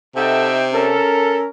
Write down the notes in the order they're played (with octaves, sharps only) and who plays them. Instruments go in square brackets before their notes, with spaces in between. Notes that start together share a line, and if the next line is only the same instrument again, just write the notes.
[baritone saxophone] C3 [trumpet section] D#4 E5 G5 [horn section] A4 F#5 A5
[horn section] C#4 A#4 [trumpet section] A4